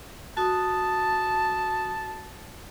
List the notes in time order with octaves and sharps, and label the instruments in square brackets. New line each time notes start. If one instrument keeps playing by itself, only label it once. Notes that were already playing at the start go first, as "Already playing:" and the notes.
[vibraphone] F#4 D#6 [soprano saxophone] A5